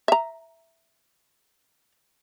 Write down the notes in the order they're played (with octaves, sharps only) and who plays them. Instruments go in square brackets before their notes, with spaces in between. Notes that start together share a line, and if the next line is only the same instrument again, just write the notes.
[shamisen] E5 A#5